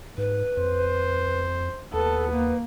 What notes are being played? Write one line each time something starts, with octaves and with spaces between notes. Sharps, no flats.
G#2 B4
F2 C5
D#2 B3 A4 B4
A#3